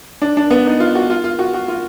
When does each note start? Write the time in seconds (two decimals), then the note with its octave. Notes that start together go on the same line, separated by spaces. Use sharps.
0.22 D4
0.37 D4
0.50 B3
0.66 D#4
0.80 F4
0.95 F#4
1.10 F4
1.24 F4
1.39 F#4
1.54 F#4
1.68 F4